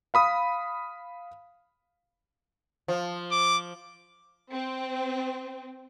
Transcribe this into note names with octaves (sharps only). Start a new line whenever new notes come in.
F5 B5 D#6
F3
D6
C4